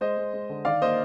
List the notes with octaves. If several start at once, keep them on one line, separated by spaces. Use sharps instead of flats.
G#3 C5 D#5
G#3
G#3
D3
D#3 D5 F5
A#3 C5 D#5